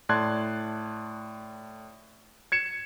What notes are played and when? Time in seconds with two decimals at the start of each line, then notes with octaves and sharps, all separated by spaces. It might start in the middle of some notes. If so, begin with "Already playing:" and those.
0.09 A2 D5 A5 C6 F#6 G#6
2.52 G#6 C#7 E7